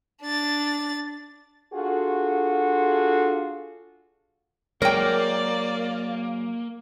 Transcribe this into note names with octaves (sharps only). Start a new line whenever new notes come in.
D4 A6
D4 F4 F#4 G#4 A4
F#3 G#3 A#3 A#4 C#5 D5 G5